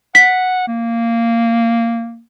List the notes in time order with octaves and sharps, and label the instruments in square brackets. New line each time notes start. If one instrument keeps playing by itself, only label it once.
[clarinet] F#5 [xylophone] B6
[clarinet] A#3